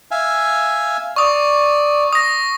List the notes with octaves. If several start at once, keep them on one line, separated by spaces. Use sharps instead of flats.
E5 F5 G#5
D5 C#6 D#6
D#6 A#6